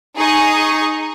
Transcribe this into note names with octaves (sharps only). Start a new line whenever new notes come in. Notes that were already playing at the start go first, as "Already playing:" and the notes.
D#4 G#4 A#5 C#6 D#6